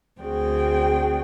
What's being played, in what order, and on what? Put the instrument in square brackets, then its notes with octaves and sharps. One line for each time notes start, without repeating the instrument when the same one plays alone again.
[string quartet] D2 C4 F#4 G#4 D5 G5